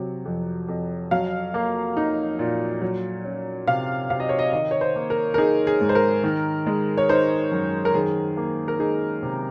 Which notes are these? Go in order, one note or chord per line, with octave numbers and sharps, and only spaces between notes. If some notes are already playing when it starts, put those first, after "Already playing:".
Already playing: C3 F#3
F2
F2
F#3 F5
A#3
D#4
A#2
F#3
C#4
C3 F5
C3 F5
D#5
C#5
D#5
D#3 D#5
C#5
C5
A#3
A#4
A#4
D#4 G#4
G#4
G#2
C5
A#4
D#3
G#3
C#5
D#4 C5
F#2
A#4
D#3 G#4
A#3
A#4
D#4 G#4
C3